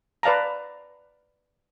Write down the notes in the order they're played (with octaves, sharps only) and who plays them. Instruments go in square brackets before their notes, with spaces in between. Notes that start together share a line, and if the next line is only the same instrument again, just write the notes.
[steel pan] B4 D5 F5 A5 A#5